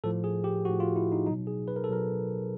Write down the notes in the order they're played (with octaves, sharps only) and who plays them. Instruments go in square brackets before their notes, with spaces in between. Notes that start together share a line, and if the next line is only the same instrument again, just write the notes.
[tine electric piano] A2 F3 A4
G#4
G4
A2 F3 F#4
F4
E4
D#4
B2 F#3 D#4
G#4
B4
A#4
A4
B2 F#3 A#4